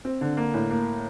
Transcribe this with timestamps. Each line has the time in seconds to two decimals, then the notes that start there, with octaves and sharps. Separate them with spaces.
0.05 C4
0.21 D3
0.37 A#3
0.54 A2
0.70 A#3